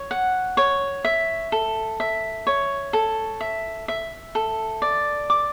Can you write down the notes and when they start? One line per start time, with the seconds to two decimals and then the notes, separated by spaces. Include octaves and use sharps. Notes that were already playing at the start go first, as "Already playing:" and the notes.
Already playing: C#5
0.11 F#5
0.57 C#5
1.05 E5
1.52 A4
2.00 E5
2.47 C#5
2.93 A4
3.41 E5
3.88 E5
4.35 A4
4.82 D5
5.30 D6